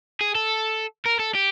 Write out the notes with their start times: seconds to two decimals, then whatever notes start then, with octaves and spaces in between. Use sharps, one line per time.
0.21 G#4
0.35 A4
1.05 A#4
1.19 A4
1.35 G4